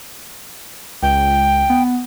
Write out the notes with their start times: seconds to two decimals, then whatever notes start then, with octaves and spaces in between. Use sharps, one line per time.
1.02 C#2 G5
1.70 B3